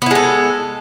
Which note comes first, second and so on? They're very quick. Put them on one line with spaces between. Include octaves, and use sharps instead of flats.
B3 E4 G#3 A4